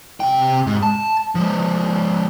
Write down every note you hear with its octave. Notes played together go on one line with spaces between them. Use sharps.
C3 G5
G#2
A5
F3 G#3